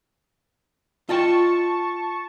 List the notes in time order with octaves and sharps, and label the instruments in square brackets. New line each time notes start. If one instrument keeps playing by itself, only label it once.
[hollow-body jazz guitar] F4 D#5 G5 [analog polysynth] A5 C#6